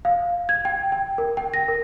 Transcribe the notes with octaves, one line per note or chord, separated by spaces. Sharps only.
F5
G#6
G5
G5
A#4
G5
A#6
A#4